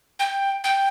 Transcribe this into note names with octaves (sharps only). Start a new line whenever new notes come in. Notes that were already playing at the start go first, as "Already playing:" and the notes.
G5
G5